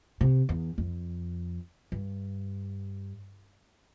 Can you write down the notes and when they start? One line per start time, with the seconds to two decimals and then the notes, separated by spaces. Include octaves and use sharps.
0.21 C3
0.49 E2
0.78 F2
1.92 G2